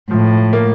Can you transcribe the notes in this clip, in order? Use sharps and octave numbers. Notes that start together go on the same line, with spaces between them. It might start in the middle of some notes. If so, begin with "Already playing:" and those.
A2 F3
A#3